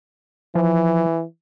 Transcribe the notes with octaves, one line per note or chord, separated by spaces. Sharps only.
E3 F3